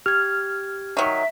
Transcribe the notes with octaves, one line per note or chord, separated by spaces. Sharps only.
G4 F6 G#6
D#3 F#3 E5